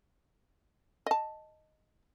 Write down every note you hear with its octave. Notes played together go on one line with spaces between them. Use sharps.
D#5 A5